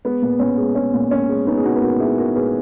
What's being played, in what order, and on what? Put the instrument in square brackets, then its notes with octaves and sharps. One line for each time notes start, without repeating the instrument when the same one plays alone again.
[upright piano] G#3 B3
A#2
A#2 C#4
G#3
G#3 C#4
A#2
A#2 C#4
G#3
G#3 B3 D#4
G#4
A#2 D#4 F#4
B4
A#2 F#4 A#4
G#3 E4 G#4
G#3 F#4 A#4
A#2 G#4 B4